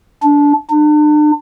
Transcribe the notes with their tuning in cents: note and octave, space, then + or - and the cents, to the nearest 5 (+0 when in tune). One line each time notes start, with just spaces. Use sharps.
D4 -20
D4 +40